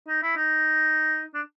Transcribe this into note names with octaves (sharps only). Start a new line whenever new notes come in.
D#4
E4
D#4
D4